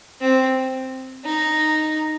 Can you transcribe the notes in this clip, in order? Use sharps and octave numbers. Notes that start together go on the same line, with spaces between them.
C4
D#4